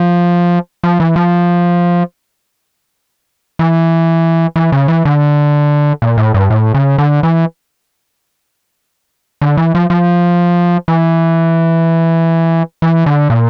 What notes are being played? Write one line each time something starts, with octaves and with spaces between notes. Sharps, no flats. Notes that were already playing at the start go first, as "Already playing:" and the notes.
Already playing: F3
F3
E3
F3
E3
E3
C#3
E3
D3
A#2
A2
G2
A2
C#3
D3
E3
D3
E3
F3
F3
E3
E3
D3
A#2